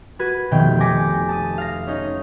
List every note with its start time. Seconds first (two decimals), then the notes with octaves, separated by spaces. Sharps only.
0.19 F#4 B4 G#6 D#7
0.51 F1 B2 D#3 G5
0.80 G#5 D6 G6 A#6 B6 C#7
1.29 A5 D#6 D#7
1.58 F5 A#6
1.87 C#4 D#4